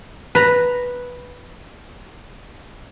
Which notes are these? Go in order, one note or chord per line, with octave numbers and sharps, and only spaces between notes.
B4 A#5